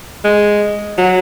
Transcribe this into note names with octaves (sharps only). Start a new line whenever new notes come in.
G#3
F#3